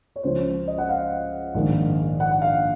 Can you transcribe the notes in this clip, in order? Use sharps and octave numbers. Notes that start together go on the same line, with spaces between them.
C#5
C#2 C#3 F3 C5
D#5
F#5
F5
A#1 G#2 D#3
F#5
F5